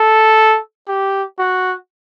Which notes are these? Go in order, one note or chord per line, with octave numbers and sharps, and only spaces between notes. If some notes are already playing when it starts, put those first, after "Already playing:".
Already playing: A4
G4
F#4